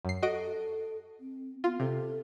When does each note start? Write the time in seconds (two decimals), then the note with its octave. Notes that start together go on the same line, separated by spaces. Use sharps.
0.05 F#2 C7
0.22 F#4 A4 D#5 D7
1.20 C4
1.64 B3 F4
1.80 C3 A4